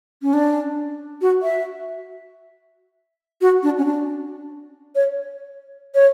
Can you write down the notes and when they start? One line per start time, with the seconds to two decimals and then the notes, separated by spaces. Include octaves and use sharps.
0.22 C#4
0.33 D4
1.21 F#4
1.42 E5
3.41 F#4
3.63 D4
3.77 C#4
3.85 D4
4.95 C#5
5.95 C#5